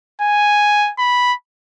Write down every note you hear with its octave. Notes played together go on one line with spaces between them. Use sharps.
G#5
B5